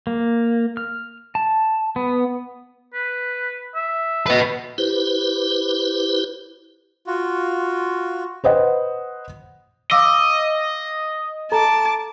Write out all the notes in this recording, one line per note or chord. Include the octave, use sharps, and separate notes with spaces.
A#3
F6
A5
B3
B4
E5
B4 D#5
E4 G4 B4 C5
F4 F#4
B4 C5 D#5 F#5
D#5 F5 D6 E6
A4 A5 A#5 D6